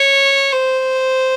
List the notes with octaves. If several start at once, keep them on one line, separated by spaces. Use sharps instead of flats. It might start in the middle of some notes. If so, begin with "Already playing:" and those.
Already playing: C#5
C5